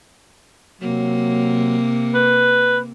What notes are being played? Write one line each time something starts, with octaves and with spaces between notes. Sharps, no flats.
C3 F#3 A#3
B4